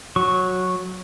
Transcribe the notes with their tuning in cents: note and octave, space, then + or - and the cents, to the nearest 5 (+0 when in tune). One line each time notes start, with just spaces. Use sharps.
F#3 -10 C#6 -10